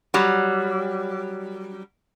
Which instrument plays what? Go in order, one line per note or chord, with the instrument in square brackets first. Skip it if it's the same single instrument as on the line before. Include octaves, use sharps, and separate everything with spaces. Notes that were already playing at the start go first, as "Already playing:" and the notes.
[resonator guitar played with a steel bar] F#3 G3